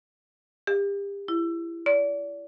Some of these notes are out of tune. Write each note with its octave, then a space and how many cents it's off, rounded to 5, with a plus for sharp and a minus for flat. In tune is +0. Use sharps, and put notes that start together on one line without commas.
G4 +35
E4 +25
D5 -35